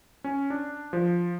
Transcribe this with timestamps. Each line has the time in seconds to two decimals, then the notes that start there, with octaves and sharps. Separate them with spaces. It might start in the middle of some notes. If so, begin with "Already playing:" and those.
0.24 C#4
0.50 D4
0.93 F3